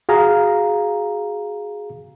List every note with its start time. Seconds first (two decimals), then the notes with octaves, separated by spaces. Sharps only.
0.09 F#4 G#4 F5 A#5